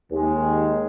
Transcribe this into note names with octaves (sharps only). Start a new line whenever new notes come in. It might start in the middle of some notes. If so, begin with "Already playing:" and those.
D#2 D#3 G#3